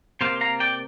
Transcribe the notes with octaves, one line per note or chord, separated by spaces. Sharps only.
C3 A#3 C5 F5
F5 A#5
D5 G5